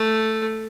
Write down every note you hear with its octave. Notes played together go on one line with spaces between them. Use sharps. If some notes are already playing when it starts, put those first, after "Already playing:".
Already playing: A3